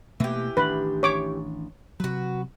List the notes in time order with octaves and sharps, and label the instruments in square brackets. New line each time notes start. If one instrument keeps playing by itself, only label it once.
[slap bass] B2 A3 A#3 [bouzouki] E3 G4
[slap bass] A1 D#3 D4 [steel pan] B4
[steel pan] C#5 D6
[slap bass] C3 F#3 [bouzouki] F#4 B4